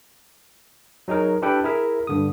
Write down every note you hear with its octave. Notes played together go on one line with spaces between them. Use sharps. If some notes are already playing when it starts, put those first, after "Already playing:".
F#3 D#4 G#4 A#4
D4 E4 G4 A4 B4 G5
E4 G#4 A#4 E5
G2 D3 D#6